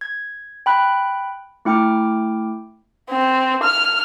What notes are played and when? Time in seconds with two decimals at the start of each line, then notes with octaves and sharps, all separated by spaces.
0.01 G#6
0.66 G5 B5 F#6
1.65 A3 E4 G5 D6 F6
3.10 C4
3.63 F6